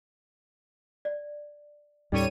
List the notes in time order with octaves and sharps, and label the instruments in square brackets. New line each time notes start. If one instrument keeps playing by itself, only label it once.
[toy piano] D5
[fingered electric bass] D#2 A2 C#4 [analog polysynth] G3 C#5 D#7 [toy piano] D#4 A4